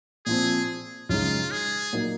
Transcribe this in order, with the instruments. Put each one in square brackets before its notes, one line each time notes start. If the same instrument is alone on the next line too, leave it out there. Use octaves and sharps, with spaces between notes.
[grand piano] A#2 F3 C4 [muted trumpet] G#4
[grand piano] F#2 C#3 G#3 D#4 [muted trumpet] F4
[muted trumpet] G#4
[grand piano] A#2 F#3 A#3 D#4